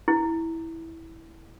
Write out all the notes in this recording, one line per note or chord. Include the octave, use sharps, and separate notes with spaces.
E4